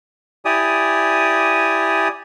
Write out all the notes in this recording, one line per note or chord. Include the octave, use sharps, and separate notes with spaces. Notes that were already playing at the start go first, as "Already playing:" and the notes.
E4 G4 D5 G#5 D#6